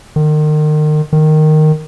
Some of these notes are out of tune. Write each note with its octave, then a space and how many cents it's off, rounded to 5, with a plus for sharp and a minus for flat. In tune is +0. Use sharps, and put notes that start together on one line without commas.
D#3 -35
D#3 -10